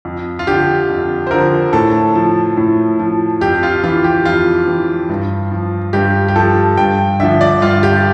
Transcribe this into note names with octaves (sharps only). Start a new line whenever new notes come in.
F2
F4
D3 F3 G4
F2
C5
D3 F3 A#4
A2 A4
F3
A2
F3
F2 G4
F4
E3 F4
G4
F2 F4
E3
G2
F3
G2 G4
G4
F3 A4
G2 G5
D3 F3 E5
D5
G2 F4
G4